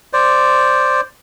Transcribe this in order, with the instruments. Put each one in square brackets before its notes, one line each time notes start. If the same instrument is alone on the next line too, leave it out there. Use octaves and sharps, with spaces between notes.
[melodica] C5 D5